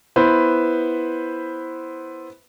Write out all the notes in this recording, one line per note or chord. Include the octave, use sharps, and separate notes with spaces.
B3 E4 B4 C5